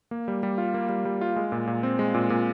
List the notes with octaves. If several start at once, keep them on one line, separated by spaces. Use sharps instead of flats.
A#3
G3
G3
F4
A#3
G3
G3
F4
G#3
A#2
A#2
C4
G#3
A#2
A#2